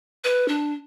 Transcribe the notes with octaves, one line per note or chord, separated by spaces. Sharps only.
B4
D4